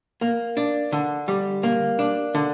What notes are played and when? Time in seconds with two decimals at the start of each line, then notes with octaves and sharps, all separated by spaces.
0.21 A#3
0.57 D4
0.92 D3
1.28 G3
1.63 A#3
1.99 D4
2.35 D3